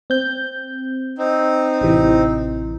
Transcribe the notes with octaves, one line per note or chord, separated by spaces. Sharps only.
C4 G6
C4 D#4
A1 C3 E3